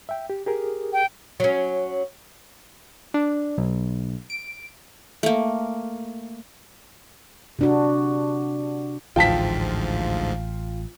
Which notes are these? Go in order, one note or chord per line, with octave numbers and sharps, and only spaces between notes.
E5 G5
G4
G4 G#4 A#4
G5
F#3 C#4
D4
B1
D7
A3 A#3
C3 D4 F#4
A1 D2 G#2 F3 F4 G5 A5 B6